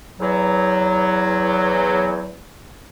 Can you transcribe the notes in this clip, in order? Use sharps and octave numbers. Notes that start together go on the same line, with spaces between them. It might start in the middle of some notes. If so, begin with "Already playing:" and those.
E2 F#3